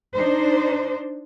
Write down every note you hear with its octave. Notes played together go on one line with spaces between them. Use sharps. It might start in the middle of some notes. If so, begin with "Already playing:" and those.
D4 D#4 C5